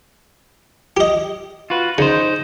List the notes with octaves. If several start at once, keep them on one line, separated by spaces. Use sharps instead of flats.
G4 D#5
F4 F#4 B4
C#3 D#4 C5